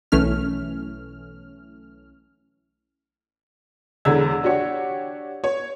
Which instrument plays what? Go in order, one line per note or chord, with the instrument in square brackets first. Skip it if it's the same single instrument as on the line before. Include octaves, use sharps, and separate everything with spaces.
[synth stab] B1 E3 A3 C#4 F6
[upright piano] E1 E2 D3 E6 G#6
D4 F#4 G4 C#5
C#5